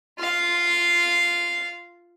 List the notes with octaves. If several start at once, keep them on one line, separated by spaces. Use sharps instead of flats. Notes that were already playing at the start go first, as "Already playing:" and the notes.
F4 F5